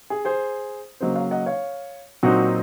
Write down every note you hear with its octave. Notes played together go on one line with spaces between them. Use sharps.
G#4
G#4 C5
C#3 F#3 A#3 C5 D#5
C#5 F5
D#5 F#5
C#5 F5
A#2 F#3 C4 D#4 F#4